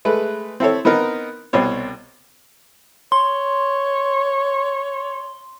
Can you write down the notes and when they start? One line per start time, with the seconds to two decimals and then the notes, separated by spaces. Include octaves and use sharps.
0.05 G#3 A3 B4
0.60 C4 E4 A4 C#5
0.85 B3 C4 D#4 A#4
1.53 C2 B2 C4 C#5
3.12 C#5 C6